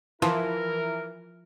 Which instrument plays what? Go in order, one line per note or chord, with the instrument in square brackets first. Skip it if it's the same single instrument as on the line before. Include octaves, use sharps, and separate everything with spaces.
[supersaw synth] E3 [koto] F3 [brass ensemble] E4 A#4